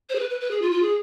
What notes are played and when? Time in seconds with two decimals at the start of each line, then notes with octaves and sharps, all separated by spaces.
0.09 C5
0.15 G#4
0.19 B4
0.30 B4
0.41 B4
0.51 G#4
0.62 F4
0.72 F4
0.82 G#4